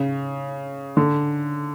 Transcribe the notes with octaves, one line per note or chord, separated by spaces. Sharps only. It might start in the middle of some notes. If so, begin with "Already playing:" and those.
Already playing: C#3
D3